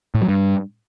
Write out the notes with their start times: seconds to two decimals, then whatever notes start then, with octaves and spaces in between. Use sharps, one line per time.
0.15 A2
0.22 F#3
0.28 G2